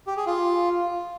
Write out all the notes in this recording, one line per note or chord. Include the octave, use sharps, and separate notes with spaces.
G4
G#4
F4